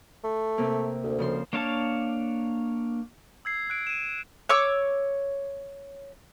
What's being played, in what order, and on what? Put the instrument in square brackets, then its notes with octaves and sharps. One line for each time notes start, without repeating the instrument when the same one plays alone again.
[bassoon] A3
[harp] C3 A#3
[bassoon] D2
[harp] C#3 F3 C6
[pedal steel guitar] A#3 D4 C#5 F5 A5
[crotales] E6 G#6 C7
F#6 D7
D#7 E7
[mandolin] C#5 C#6 D6 E6